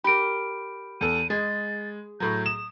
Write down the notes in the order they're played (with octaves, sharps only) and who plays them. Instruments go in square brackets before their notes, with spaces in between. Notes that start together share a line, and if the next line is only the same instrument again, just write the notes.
[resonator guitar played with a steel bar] G4 A#4 [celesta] B5 D7
[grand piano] E2 A4 [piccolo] D#7
[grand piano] G#3 [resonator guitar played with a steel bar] G#4 [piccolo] A6
[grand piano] A2 F#3 [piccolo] G6
[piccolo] D#6 [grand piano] E7